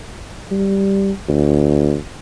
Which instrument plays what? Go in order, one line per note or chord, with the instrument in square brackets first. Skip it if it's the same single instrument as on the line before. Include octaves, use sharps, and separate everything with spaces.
[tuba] G3
D2